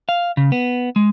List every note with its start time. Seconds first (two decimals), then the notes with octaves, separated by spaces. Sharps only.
0.09 F5
0.37 C#3
0.52 B3
0.96 G#3